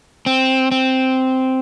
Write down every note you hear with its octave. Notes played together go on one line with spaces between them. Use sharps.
C4
C4